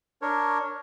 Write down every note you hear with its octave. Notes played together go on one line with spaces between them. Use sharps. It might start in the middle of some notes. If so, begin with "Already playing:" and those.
D4 A#4 C#5